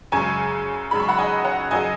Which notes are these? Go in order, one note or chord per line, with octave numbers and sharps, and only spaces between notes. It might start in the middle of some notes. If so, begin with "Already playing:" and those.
F#2 C#3 G#3 G#5 C#6
F#2 C#3 G#3 B5
C#6
F#5 B5
D#5 G#5
C#5 F#5
F#2 C#3 F#3 D#5 G#5